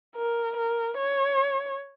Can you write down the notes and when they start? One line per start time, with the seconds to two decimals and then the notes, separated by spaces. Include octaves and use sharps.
0.16 A#4
0.57 A#4
0.97 C#5